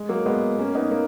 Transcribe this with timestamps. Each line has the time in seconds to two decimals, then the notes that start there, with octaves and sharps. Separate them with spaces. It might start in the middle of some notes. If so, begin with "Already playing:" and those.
Already playing: G#3
0.09 F#3 A#3
0.26 G#3 B3
0.59 A#3 C#4
0.75 B3 D#4
0.91 A#3 C#4